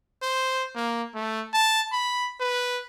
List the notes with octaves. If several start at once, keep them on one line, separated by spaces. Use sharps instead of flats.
C5
A#3
A3
A5
B5
B4